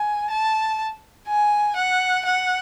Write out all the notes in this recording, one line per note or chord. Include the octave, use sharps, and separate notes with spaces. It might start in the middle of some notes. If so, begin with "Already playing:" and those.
Already playing: G#5
A5
G#5
F#5
F#5